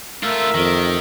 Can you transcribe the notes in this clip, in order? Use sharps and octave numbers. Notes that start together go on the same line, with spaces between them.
A3 F4 A#4 E5
F2 D#3